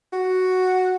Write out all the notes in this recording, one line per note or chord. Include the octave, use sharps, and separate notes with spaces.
F#4